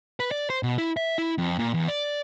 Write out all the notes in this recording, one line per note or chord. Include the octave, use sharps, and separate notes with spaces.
B4
D5
C5
B2
E4
E5
E4
F2
A#2
E2
D5